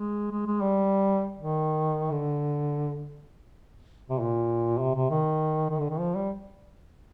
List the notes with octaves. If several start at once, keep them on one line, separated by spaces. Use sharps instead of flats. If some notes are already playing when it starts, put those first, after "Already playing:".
Already playing: G#3
G#3
G#3
G3
D#3
D3
C3
A#2
C3
C3
D#3
D#3
D3
D#3
F3
G3